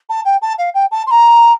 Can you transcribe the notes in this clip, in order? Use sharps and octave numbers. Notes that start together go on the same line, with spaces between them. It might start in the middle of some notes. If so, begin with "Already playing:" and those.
A5
G5
A5
F5
G5
A5
C6
A#5